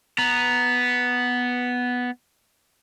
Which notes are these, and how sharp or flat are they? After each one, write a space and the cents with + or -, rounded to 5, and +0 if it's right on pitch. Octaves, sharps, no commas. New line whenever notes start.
B3 +0 A#5 +5